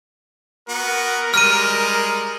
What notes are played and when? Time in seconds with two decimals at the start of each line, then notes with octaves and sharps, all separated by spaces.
0.69 B3 F#4 A#4
1.34 G3 G#3 F6 D#7